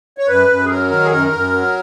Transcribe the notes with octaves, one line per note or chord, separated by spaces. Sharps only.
C#5
F#2 B4
F#2
G#4
F#3 A#4
D#3
G#4
F#2 A#4
F#2
F#3